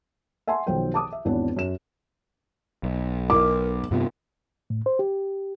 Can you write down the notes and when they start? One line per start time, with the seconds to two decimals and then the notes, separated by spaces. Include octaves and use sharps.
0.47 E5 F#5 G#5 A5 C6
0.67 B1 D#3 F3 F#3 C5 G5
0.94 A5 D6 D#6
1.12 E5
1.25 G#1 E2 B3 C4 D4 C#5
1.56 F#2 E7
2.83 B1
3.30 A#4 D6
3.91 G2 C3 B3 F4
4.70 A2
4.86 C5
4.99 G4